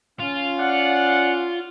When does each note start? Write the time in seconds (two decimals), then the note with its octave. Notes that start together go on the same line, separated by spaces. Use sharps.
0.20 C#4 F4 F5
0.60 D5 F#5